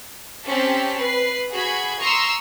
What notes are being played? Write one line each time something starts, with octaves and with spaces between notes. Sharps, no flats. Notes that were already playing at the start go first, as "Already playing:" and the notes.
C4 C#4 G4 A5 B6
B4 C7
F#4 G#4 B5 G#6
A#5 C6 C#6 D#6 E6 C7